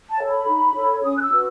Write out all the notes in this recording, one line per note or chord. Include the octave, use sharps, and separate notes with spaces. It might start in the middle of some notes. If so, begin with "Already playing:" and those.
A5
A4 C#5
B5
D#4
A4 C#5
C#4 D#6
F#6
E6
F#4 B4